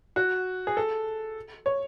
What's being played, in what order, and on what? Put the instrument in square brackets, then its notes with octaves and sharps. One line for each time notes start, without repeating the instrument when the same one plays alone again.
[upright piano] F#4
G#4
A4
C#5